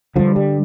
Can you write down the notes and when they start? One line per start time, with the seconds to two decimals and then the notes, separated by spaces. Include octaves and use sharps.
0.16 G2 D3 F3
0.36 G3